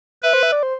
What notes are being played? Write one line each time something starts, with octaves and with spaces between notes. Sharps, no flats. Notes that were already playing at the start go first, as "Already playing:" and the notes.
B4 E5
C5
E5
D5
C5